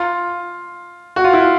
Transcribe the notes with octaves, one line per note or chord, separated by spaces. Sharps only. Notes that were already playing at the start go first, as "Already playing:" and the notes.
Already playing: F4
F#4
F4
E4
F4